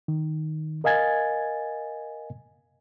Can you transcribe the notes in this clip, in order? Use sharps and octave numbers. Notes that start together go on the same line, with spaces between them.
D#3
A#4 D#5 F5 G#5 G#6 A6